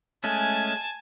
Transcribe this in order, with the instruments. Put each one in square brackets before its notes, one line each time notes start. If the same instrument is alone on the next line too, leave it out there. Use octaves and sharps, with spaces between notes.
[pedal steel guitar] G#3 A3 C#4 [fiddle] G#5 A5